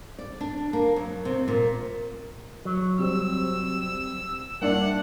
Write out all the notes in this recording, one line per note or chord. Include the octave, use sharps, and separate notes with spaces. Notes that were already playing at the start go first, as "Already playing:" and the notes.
D5
D4
A#3
F#2
C3
A#2
F#3
C3 G3 C5 E6
G2 A#3 D4 E4 F#5